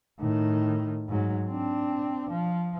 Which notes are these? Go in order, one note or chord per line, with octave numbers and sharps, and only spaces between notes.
A2 D#3
G#2 F#3
C4 D4
F3